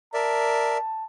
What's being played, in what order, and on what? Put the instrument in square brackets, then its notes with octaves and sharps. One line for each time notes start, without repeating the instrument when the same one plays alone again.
[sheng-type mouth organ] A#4 D5 E5 [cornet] A5